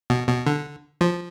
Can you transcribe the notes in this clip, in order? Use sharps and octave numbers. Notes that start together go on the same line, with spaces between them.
B2
B2
D3
F3